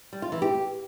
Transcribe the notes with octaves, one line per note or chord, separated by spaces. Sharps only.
G3
F4
E3
G4